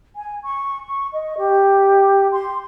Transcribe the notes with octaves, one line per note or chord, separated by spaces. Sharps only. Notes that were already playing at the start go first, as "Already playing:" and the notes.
G#5
C#6
C#6
D#5
G4
C6